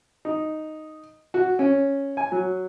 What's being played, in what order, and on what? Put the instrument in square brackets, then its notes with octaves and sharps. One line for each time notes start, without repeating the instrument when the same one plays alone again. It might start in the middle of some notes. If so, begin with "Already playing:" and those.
[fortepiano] D#4
F#4
C#4
G#5
F#3